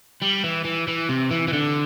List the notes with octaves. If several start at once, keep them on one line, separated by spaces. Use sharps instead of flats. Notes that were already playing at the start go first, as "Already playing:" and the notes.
G3
E3
E3
E3
C3
E3
E3
D3